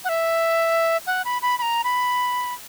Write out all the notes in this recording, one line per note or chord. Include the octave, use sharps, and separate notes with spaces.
F#5
E5
F#5
B5
B5
B5
A#5
B5